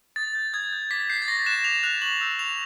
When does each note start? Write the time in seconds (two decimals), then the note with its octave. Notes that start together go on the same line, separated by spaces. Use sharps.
0.16 D#6 A6
0.35 G6
0.53 D#6 G#6
0.73 G6
0.91 D6 B6
1.09 G6 C7
1.22 A6
1.28 C#6 A#6
1.46 F#6 E7
1.64 D6 F7
1.83 F#6 F7
2.02 C#6 F#7
2.21 E6 G6
2.39 C#6 F7